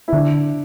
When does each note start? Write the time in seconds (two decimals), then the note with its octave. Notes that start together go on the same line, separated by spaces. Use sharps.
0.08 E4
0.13 D3 D4